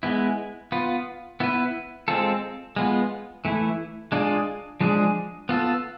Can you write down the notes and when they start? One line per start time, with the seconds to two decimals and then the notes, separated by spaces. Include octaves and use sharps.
0.03 G#3 B3 E4
0.72 B3 F4 B4
1.40 B3 E4 B4
2.08 G#3 C4 F4 A4
2.76 G#3 B3 F4
3.45 E3 A3 E4
4.12 G#3 D4 F4 G#4
4.81 F3 G#3 D4 G#4
5.49 B3 F4 A4